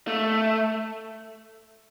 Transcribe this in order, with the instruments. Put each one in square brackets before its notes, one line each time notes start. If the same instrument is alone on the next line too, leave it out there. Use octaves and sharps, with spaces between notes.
[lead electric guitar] A3